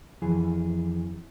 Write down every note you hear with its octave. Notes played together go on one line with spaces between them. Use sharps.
F2 E3 G#4